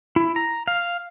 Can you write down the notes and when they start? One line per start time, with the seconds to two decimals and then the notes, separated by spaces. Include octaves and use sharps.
0.16 E4
0.36 A#5
0.68 F5